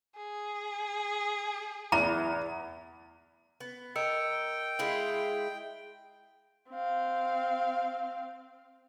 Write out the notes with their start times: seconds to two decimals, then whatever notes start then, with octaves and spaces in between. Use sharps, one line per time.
0.16 G#4
1.92 E2 A#5
3.60 B3
3.96 A#4 D#5 G5 E6 C#7
4.79 G#3 E4 F4
6.70 C4 F5